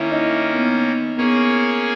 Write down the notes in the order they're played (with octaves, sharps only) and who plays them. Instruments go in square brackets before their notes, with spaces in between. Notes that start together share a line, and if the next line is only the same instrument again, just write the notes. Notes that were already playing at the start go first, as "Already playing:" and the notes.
Already playing: [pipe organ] D#3 A#3 C#4 [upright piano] E4
[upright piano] D#4
B3
[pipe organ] A#3 C#4 G#4 C#5 [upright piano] B3